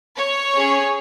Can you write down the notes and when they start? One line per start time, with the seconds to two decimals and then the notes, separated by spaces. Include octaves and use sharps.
0.17 C#5
0.54 C#4 G#4